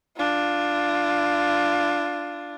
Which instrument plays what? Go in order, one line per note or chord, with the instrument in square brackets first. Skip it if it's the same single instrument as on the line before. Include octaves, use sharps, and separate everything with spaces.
[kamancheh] D4 F4